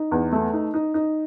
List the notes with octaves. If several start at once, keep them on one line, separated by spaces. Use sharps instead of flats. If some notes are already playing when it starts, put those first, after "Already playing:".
Already playing: D#4
E2
A3
D#4
D#4
D#4